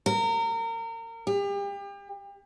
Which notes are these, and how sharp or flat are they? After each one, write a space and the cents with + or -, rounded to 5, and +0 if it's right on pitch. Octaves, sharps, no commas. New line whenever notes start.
A#4 -30
G4 +35